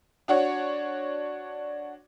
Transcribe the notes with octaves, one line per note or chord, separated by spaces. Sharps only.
D4 F#4 C#5 F#5